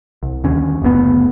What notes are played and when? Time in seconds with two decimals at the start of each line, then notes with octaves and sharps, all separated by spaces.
0.23 C2
0.44 D#2 D3 C#4
0.82 F#1 D2 A2 B3